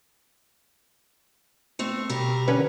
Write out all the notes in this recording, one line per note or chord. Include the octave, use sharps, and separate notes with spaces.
A3 C4
B2 G3 A#4
D3 C#4 B4